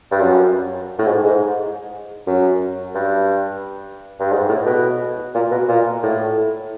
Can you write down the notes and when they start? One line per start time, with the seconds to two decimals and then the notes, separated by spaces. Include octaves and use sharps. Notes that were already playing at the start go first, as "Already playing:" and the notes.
0.11 G2
0.21 F#2
0.99 A2
1.06 G#2
1.24 G#2
2.27 F#2
2.95 G2
4.20 G2
4.32 G#2
4.49 A2
4.66 B2
5.35 A#2
5.51 B2
5.68 A#2
6.03 A2